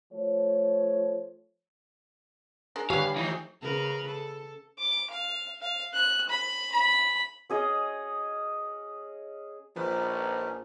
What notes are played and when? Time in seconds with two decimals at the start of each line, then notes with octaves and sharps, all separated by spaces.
0.13 F3 A3 C#5
2.76 G#3 D4 A#4
2.90 D3 G3 C#4 G4 B4 F5
3.16 E3 F3 A3 D#4
3.61 C#3 A#4 B4
4.07 A4
4.79 D6
5.11 F5
5.61 F5
5.93 F#6
6.29 B5
6.72 B5
7.50 C#4 G#4 D#5
9.76 A#1 F3 C#4 D#4 B4